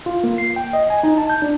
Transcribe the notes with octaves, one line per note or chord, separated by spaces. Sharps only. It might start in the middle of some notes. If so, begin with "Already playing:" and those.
F4
A#3
C7
G5
D#5
G#5
D#4
A5
G6
D4